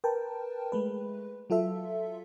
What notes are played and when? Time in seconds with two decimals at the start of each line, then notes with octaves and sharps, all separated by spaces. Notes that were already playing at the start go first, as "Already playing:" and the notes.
0.04 A#4 B4 G5 A5
0.72 G#3 A3 B4
1.50 F#3 F4 A4 E5